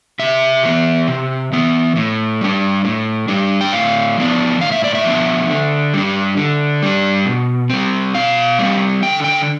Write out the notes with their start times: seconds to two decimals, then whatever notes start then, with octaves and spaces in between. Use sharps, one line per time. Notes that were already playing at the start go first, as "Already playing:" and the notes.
0.19 C3 E5
0.63 E3 B3
1.07 C3
1.52 E3 B3
1.96 A2
2.41 G3 D4
2.85 A2
3.28 G3 D4
3.61 G5
3.72 A2 F5
4.17 F3 B3 D4
4.61 A2 F5
4.72 E5
4.84 D5
4.95 E5
5.05 F3 B3 D4
5.50 D3
5.94 G3 D4
6.37 D3
6.82 G3 D4
7.26 B2
7.70 G3 C4
8.14 B2 F5
8.59 G3 C4
9.03 D3 G5
9.24 G5